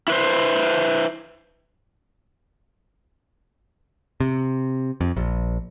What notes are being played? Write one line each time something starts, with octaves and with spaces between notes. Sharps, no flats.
E4 B4 C5
C3
F2
A#1